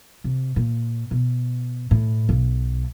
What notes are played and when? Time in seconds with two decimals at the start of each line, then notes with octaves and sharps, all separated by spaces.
0.24 C3
0.56 A#2
1.11 B2
1.91 A2
2.29 B1